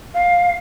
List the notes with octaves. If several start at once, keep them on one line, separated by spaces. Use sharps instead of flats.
F5